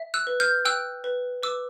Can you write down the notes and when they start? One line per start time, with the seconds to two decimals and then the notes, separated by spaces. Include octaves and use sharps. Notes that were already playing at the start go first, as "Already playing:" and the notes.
Already playing: E5
0.14 E6 F#6
0.27 B4
0.40 F6 G6
0.65 G5 E6 F#6
1.04 B4
1.43 B4 D6 E6